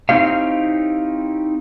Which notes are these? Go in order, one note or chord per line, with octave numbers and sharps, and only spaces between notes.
C4 D#4 E4 G4 C#5 F5